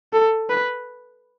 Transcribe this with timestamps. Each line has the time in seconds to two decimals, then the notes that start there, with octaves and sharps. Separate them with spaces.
0.13 A4
0.50 B4